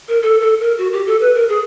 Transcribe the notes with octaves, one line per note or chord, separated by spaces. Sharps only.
A#4
A4
A4
A#4
F#4
G4
A4
B4
A#4
G#4